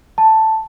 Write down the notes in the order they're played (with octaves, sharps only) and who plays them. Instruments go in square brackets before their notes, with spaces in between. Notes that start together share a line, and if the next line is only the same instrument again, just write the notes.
[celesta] A5